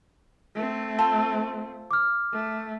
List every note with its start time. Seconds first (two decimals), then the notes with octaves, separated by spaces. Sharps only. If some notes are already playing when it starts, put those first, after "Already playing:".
0.55 A3 C4
0.98 F4 A4 C5
1.91 D6 F6
2.32 A3